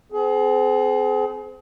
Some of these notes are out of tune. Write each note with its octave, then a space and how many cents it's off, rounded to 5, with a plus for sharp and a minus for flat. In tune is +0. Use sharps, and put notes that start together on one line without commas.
C4 -30 G#4 +35